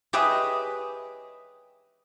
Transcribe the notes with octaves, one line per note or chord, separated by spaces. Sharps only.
G4 G#4 B4 C#5 D#5 E5